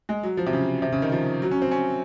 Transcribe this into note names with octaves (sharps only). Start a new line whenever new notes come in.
G#3
F#3
F3
C3
C#3
C3
C#3
D#3
F3
F#3
C#4
C4
C#4